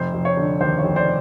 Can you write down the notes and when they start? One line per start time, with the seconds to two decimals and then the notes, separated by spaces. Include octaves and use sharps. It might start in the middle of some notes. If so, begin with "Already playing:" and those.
Already playing: F1 C5
0.14 F1
0.25 C#5
0.37 D3
0.61 D#2 C5
0.79 C#5
0.84 F1
0.96 C5 D5